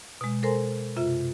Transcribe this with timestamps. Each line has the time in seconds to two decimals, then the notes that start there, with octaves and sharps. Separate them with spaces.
0.21 B2 G#3
0.43 A4 A#4 C5 G#5 A#5 C6
0.96 F#2 C3 F4 E5